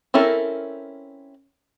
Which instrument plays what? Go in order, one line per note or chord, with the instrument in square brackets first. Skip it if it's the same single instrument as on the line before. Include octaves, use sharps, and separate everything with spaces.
[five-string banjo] C4 C#4 E4 A4 A#4